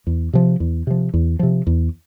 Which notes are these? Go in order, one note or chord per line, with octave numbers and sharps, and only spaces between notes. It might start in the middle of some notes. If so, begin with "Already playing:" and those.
E2
C3 F3
E2
C3 F3
E2
C3 F3
E2